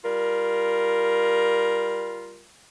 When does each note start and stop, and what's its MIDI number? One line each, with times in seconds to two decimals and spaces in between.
0.03 2.44 55
0.03 2.44 65
0.03 2.44 70